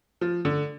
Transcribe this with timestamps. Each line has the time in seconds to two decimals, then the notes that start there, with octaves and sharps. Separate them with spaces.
0.21 F3
0.45 D3